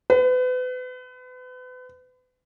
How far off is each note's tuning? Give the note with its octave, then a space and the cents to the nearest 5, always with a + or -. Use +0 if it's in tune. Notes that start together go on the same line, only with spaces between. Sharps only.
B4 +35